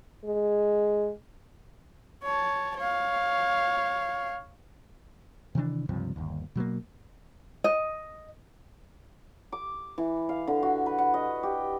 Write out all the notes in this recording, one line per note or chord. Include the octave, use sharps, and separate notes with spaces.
G#3
C#5 A5
C#5 F5
C3 D#3 E3 D4
C#2 G2 C3 F3
G1 D#2
B2 F#3 G#3 A#3
D#5
D6
E3
F5
D3
F#4
B4
F#5
D#5
G4